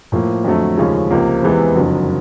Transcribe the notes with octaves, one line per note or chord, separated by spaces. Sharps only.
A2 F3 A#3
F2 D3 F#3 A3
D#2 C#3 F3 G#3 C#4
C#2 C3 F3 A#3
E2 C3 E3 G#3 B3
F#1 F2 D3 F#3